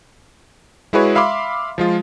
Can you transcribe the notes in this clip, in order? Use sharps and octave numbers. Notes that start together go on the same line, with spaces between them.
G#3 E4 F#4 G#4 B4 C#5
E5 F5 B5 C6 D6
F3 G#3 F4